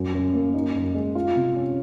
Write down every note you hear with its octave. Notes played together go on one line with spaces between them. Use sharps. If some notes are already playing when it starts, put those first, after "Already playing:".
Already playing: F#2 F#3
F#2
A#3
D#4
F#2
G#3
F4
C3
C#4